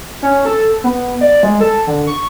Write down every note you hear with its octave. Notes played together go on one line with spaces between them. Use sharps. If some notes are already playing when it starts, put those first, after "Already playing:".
C#4
A4
B3
D5
G#3
A4
D3
C#6